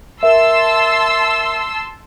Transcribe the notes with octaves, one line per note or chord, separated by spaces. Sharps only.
A#4 E5 A5 C6 E6